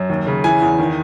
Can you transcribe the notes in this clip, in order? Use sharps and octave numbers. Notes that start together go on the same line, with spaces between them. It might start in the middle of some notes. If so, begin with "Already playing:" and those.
Already playing: F#2
D#2
C#3
E3 G#5
E2
D#3